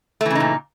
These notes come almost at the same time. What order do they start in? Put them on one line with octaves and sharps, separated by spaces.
A3 E3 C#3 D#4 A#2